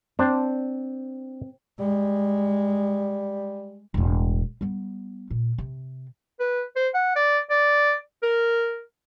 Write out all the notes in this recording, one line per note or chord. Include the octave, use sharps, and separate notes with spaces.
C4 D4 C5
G3 G#3
E1 A2
G3 B3
A#2
C3
B4
C5
F#5
D5
D5
A#4